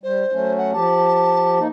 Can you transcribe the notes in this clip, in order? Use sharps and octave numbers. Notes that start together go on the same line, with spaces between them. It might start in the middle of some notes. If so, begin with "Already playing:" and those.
G3 C5
F#3 A3 C#4
F#5
F3 G4 A5
A#3 D#4